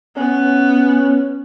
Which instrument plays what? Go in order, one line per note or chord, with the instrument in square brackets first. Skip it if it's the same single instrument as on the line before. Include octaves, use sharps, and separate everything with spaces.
[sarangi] B3 [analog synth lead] C#4